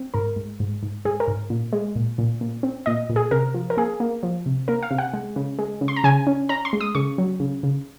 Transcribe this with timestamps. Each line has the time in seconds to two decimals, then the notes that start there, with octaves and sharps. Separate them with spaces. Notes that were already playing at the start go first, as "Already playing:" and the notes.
Already playing: C4
0.14 G#2 A#4
0.36 G#2
0.60 G#2
0.83 G#2
1.05 G#2 G#4
1.20 A#4
1.28 G#2
1.50 A#2
1.73 G#3
1.96 A#2
2.18 A#2
2.41 A#2
2.63 C4
2.86 A#2 D#5
3.10 A#2
3.16 G#4
3.31 C3 A#4
3.54 F3
3.70 A#4
3.77 A#3 G#4
4.00 A#3
4.23 F3
4.46 C3
4.68 A#3 A#4
4.83 F5
4.91 C3
4.98 F#5
5.13 G#3
5.36 C#3
5.59 G#3
5.81 C#3
5.88 C6
5.96 A#5
6.04 C#3 G#5
6.27 C#4
6.49 C#4 A#5
6.65 C6
6.73 G#3
6.81 D#6
6.95 C#3 C#6
7.18 F#3
7.40 C#3
7.63 C#3